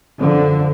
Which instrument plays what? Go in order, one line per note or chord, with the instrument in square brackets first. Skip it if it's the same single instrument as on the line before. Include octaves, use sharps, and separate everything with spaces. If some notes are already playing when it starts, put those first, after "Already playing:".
[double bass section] F#2 D3 F3